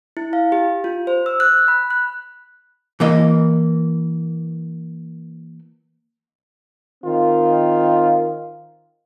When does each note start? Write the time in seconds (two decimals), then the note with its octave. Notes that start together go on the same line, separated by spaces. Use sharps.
0.17 E4
0.33 F5
0.52 G4
0.84 F4
1.07 C5
1.26 E6
1.40 F#6
1.68 B5
1.90 F#6
3.00 E3 A#3 D#5
7.04 D#3 C4 F4